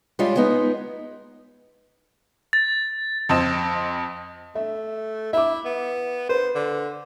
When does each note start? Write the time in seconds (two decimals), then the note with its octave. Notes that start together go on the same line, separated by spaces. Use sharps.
0.19 G3 G#3 C#4 F4
0.36 G#3 B3 D#4
2.53 A6
3.29 F2 C4 D#5 E7
4.55 A3 E5
5.33 E4 E5 D6
5.65 B3
6.29 B4 C5
6.55 D3